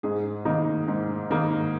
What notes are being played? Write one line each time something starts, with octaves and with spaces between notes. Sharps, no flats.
G#2 G#4
D#3 A#3 D#4
G#2
D#3 A#3 D#4 A#4